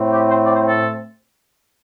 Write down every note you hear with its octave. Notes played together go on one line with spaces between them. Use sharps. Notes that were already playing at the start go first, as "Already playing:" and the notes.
Already playing: A2 A3 C4
G4
C5
D5
C5
A4